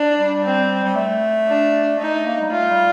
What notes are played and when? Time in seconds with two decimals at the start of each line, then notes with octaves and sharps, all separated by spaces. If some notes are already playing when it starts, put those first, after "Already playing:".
Already playing: D4
0.18 G3
0.44 C4
0.84 G3
0.95 A3
1.48 D4
1.99 A3 D#4
2.26 A#3
2.41 G3
2.51 A3 F4
2.69 G3